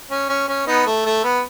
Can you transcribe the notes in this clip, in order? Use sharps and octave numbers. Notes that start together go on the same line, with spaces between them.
C#4
C#4
C#4
B3 D#4
A3
A3
B3